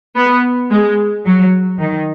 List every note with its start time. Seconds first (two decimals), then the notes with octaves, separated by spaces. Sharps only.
0.16 B3
0.71 G#3
1.26 F#3
1.80 D#3